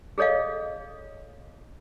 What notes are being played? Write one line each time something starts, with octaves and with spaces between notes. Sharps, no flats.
G#4 A4 C#5 D#5 F5